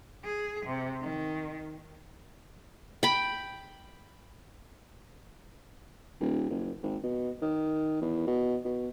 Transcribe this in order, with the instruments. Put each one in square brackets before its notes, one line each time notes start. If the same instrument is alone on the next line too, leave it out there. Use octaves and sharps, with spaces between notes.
[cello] G#4
C3
D#3
[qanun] G5 B5
[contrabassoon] D#1
F#1
G#1
B2
D#3
E2
B2
B2